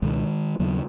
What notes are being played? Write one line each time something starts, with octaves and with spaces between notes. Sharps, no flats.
C#2 B2 D#3 G#3
D#2 C#3 F#3 B3